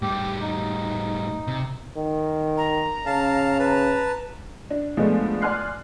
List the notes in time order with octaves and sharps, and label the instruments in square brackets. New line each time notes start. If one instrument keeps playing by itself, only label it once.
[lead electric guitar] A2 G3 [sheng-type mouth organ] G4
[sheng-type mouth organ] D#4
[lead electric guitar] C3
[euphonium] D#3
[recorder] A#5
[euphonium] C#3 [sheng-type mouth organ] F5 A5
[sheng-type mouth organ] B4 A5
[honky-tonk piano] D4
F3 G#3 A3 B3 D4
D5 G#5 C6 F6 F#6 C7